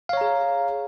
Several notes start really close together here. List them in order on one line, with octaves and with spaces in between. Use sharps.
F5 C#5 A#5 G#4